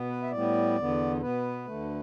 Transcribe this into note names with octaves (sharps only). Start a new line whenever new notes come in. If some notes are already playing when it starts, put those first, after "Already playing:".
Already playing: B2 B3
B4
E5
A2 G3 B3 D5
E2 D3 B3
B2 B3 B4
D2 D3 A3